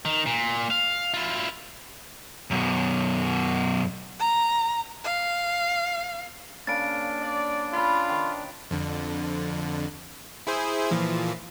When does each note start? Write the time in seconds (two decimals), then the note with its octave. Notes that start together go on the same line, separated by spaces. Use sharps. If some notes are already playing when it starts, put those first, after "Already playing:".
0.05 D#3
0.26 A#2
0.70 F5
1.14 E4 F4
2.51 F#2 B2
4.20 A#5
5.04 F5
6.67 C#3 A#3 D4 F5 A6 D7
7.22 D5
7.73 F4 B4 B5
8.09 D#3
8.71 F2 D3
10.47 E4 G#4 C5
10.91 A#2 E3 F3